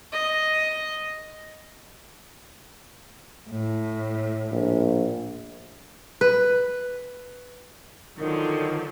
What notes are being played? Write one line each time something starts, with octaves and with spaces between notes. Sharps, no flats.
D#5
A2
A#1
B4
D3 D#3 F3 F#3